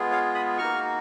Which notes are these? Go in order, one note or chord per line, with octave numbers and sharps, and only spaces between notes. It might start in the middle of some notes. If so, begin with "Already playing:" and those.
Already playing: G#3 B3 F4 G#4
C#5 F5
B5 D#6
A#3 D#4 F#4 C#6 F6